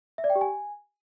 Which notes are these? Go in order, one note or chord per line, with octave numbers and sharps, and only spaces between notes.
E5
D5
G5
G4
G#5